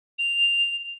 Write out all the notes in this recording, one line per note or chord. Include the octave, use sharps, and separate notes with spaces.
F7